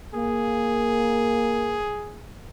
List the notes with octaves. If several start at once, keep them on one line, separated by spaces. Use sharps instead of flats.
A#3 G#4